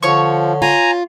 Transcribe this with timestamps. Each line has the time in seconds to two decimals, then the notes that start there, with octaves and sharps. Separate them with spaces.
0.03 D3 F3 C#5 C#6
0.62 F4 G#5 A#5